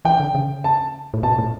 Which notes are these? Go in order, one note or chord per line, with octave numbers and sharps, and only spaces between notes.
E3 G5
D3
C#3
A5
A2
B2 A5
A2